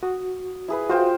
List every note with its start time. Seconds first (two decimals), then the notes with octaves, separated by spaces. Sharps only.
0.03 F#4 D#6
0.68 E4 G#4 B4
0.90 F4 F#4 C5 G5